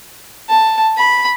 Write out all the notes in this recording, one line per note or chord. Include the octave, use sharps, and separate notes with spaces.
A5
B5